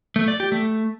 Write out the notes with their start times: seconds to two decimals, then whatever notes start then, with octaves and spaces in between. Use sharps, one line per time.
0.16 A3
0.28 D5
0.40 G4
0.52 A3